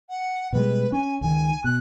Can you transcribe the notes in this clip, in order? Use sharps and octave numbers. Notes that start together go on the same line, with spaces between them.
F#5
B2 G3 G#3 B4
C#4 G#5
C#2 D#3 G#5
B2 F#6